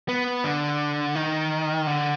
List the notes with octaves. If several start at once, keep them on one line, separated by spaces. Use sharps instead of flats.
B3
D3
D#3
D3